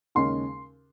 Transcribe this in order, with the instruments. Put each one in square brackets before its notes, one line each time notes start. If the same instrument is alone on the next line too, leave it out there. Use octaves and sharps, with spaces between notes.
[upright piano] D#2 C#3 G#3 C#4 C6